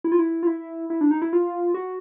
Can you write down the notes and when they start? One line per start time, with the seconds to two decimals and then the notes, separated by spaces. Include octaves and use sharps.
0.04 E4
0.12 F4
0.19 E4
0.43 F4
0.47 E4
0.90 E4
1.01 D4
1.11 D#4
1.22 E4
1.33 F4
1.74 F#4